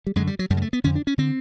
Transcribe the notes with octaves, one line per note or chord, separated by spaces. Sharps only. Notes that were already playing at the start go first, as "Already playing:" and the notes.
G3
F#2 D3 G#3
G3
F#3
F#2 C#3 G3 G#3
A3
B3
F2 D3 C#4
D4
C#4
D3 C4